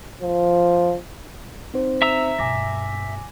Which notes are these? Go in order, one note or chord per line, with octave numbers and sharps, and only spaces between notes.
F3
C4 D#4 C5
E5 A#5 E6
G2 B2 G#5 D6 A#6